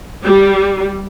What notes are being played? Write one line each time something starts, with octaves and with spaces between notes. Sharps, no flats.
G3